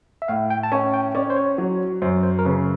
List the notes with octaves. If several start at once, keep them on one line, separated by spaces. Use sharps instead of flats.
E5
A2 F5
G5
A5
C#4 G#5
G5
C#4 D5
C#5
C5
C#5
F#3
F#2 C5
C5
A#4
C#3 B4